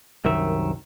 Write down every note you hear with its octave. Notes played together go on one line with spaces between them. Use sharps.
C2 F#2 D#3 E5